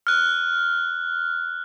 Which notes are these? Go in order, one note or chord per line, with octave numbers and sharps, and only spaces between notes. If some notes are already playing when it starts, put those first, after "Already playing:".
F6 F#6